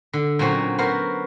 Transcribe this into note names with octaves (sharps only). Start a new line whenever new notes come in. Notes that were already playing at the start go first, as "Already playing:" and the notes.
D3
A#2 F#3 C4 C#4 F#4 C5
B3 F#4 A#4 C5